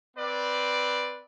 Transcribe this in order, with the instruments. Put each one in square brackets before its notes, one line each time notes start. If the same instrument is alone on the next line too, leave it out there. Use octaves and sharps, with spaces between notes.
[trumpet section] C4 B4 D5